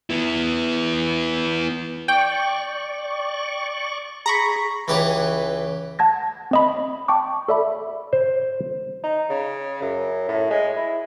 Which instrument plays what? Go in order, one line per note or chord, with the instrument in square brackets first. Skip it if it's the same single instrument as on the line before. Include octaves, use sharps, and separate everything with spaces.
[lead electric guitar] B3 E4
[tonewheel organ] D5 C#6 [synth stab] G5
[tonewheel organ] G#4 [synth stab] A#5 B5 C#6
[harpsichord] C#2 E3 G4 B4 C#5 F#5
[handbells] F#5 A5 G#6 A#6
C4 D#5 B5
G5 A5 C#6 D6
A4 D5 E5 B5
[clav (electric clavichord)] C5
[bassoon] D#4
C#3
F#2
A2
G#3
E4